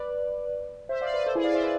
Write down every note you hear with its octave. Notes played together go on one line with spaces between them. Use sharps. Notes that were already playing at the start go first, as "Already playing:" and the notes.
Already playing: B4 D5
C5 E5
D5 F5
B4 D5
A4 C5
E4 G#4
D5 F5
C5 E5
B4 D5